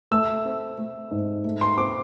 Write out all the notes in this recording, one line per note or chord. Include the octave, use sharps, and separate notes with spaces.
A3 E6
C4
A3
G#2
A3
C6
C4 D6